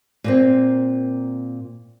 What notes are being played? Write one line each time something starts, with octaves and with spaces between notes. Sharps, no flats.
A#2 A#3 C4